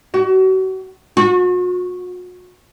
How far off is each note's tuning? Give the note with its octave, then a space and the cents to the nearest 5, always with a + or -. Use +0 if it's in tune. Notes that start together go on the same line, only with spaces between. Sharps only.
F#4 +35
F#4 -40